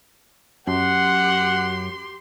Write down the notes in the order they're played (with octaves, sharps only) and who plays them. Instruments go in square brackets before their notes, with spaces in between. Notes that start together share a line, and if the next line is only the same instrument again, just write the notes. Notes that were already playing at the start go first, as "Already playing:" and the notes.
[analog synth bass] F#2 [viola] G4 C6 [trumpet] F#5